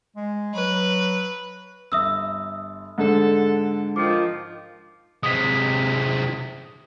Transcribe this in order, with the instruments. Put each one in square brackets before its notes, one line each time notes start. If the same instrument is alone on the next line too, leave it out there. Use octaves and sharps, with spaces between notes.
[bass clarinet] G#3
[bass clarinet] F#3 [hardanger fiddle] B4
[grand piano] G1 [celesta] E5 D#6 E6
[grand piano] G#2 D3 [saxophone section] A4
[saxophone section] D#3 F3 [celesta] D6
[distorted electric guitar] C3 G#3 [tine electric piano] D#6 B6